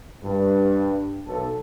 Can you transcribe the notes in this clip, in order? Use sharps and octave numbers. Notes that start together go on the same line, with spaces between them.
G2
B1 A4